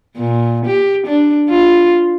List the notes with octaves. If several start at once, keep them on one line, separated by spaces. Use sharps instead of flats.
A#2
G4
D4
F4